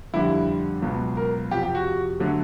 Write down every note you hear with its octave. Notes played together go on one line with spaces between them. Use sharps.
F2 D3 G3 E4
C#2 B2 F#3
A#4
F2 C3 F3 G4
G4
F#4
D3 F#3 A3